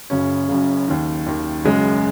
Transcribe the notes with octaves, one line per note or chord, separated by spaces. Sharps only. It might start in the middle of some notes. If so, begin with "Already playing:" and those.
F#1 F#2 C#3 C#4
F#1 F#2 C#3
D#2 D#3
D#2 D#3
F#1 F#2 C#3 G#3